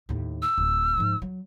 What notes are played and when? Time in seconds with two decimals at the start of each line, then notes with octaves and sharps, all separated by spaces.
0.09 D#2 A2
0.42 E6
0.58 D1
0.97 G#2 F3
1.22 F#3